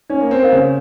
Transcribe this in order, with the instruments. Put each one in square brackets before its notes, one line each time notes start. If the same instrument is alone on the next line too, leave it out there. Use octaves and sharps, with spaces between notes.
[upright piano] C#4 [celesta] D#4
[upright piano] A#3
C4
[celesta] A#4 F5
[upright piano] C#3